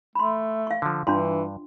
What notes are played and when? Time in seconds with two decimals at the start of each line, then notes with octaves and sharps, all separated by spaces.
0.15 A3 B5 C6
0.67 F5 C#6
0.82 D3 F3
1.07 G2 E3 D4 F4 C6